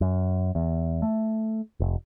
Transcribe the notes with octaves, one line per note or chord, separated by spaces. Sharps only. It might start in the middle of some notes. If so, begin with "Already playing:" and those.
F#2
E2
A3
F1